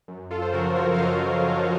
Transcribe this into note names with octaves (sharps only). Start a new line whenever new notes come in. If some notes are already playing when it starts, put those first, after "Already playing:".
F#2
F4 A4
C5
C#3 F3 F#4 A#4
A#4 C#5
F5
F#2 C5 D#5
C#3 F3